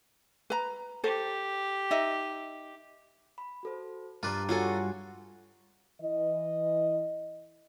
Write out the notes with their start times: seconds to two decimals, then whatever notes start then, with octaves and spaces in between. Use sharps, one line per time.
0.50 B4 A#5
1.04 G4 A4 C5
1.91 D#4 D#5 E5
3.38 B5
3.63 F#4 A4 C5
4.23 G2 G3 F4 B4 A#5 D6 A6
4.49 F#3 F4 F#4 A4 G#5
6.01 E3 D#5